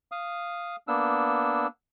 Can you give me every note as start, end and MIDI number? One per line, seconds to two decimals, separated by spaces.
0.12 0.76 77
0.12 0.76 87
0.88 1.67 58
0.88 1.67 59
0.88 1.67 62
0.88 1.67 88